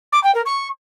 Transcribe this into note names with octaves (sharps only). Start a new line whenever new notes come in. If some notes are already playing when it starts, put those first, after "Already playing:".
D6
G5
A#4
C#6